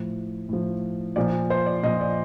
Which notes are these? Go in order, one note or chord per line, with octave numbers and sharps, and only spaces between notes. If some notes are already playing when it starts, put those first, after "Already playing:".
Already playing: A2 F3
A2 F3
A#2 F3 D5
C5
D5
A#2 F3 D#5
D5